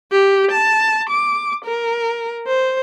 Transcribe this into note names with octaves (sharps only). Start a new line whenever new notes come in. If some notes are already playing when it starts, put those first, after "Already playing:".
G4
A5
D6
A#4
C5